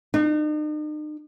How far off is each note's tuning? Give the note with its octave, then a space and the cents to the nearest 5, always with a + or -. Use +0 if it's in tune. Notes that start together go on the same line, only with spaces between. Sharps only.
D#4 -45